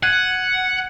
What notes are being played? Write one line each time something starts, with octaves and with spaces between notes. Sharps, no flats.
F#5 F#6 G#6 D#7